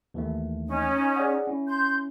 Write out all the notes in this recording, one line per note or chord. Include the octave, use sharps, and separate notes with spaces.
D#2 E3 A3
C#4 D#4
G#4 D5 F#5
C#4 E4
C6 G6